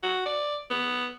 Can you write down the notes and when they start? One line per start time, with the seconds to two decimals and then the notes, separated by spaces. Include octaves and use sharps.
0.03 F#4
0.26 D5
0.70 B3